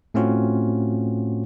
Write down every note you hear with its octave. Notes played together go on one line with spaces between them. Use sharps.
A2 A3 C4 C#4 F4 F#4